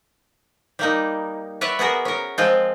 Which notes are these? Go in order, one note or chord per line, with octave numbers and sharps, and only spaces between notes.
G3 A#3 D#4
B4 C#5 D5 E5 F#5
B3 F#4 G#4 A#4
C#4 A#4
F3 G#3 C4 F4